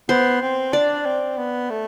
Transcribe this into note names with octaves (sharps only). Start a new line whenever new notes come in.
B3 C5
C4
D4 D5
C4
B3
A3